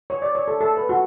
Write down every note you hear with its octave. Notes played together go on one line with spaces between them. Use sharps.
C#5
D5
C#5
A4
A4
B4
F#4